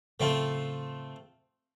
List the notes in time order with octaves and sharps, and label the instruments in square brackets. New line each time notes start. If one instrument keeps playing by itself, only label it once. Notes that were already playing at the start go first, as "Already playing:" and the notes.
[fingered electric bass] A2 C#3 F#3 [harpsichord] A3 C4 F4